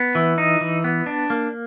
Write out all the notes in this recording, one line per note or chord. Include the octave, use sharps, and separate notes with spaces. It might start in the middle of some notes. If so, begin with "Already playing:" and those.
Already playing: B3
E3
D#4
E3
B3
D4
A#3